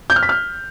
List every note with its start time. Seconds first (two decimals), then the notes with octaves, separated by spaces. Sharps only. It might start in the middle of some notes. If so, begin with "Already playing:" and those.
0.10 G6
0.16 F6
0.23 B6
0.29 F6